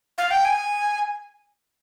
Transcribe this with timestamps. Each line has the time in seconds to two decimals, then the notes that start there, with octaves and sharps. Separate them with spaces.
0.18 F5
0.31 G5
0.45 G#5